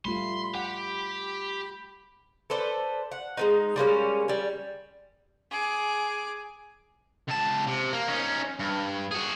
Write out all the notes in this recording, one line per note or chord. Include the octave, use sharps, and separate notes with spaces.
G3 A3 F4 B5 C6
G4 F#5
A4 B4 C5 D5
F#5
G#3 B3 D#4
G3 G#3 A#3 C#4
G3 G#4
G#4 D6
C#2 A5
C3
A#3 A#4
C#4 D#4
G2
F#4 G#4